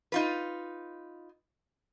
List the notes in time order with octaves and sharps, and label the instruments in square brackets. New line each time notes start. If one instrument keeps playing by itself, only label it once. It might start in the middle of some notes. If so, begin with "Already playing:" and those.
[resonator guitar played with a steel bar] D#4 F4 B4